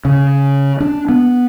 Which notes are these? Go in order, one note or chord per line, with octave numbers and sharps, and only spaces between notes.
C#3
D4
B3